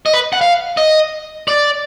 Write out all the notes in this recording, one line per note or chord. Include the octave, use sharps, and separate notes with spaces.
D#5
B4
F#5
F5
D#5
D5